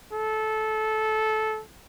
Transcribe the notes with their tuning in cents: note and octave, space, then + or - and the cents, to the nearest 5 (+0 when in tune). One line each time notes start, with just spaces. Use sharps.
A4 -15